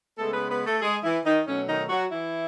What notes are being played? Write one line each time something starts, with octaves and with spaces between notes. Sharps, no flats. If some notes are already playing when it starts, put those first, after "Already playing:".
C#3 G#3 A3 B3 A4
B3 B4
B3 B4
A3 A4
G#3 G#4
E3 E4
D#3 D#4
B2 F#3 A3 C#4
D#3 D#4
F#3 F#4
E3 E4